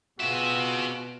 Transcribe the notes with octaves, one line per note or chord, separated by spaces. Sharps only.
B2 C4 F4 F#4 G#4 E5